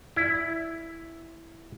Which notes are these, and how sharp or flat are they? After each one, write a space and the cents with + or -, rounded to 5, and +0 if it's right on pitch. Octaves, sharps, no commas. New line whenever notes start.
E4 +0 D5 +0